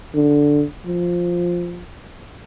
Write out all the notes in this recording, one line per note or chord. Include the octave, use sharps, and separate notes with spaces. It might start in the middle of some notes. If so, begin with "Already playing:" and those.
D3
F3